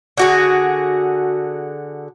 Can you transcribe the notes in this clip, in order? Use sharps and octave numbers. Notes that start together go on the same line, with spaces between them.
D3 F#4 G#4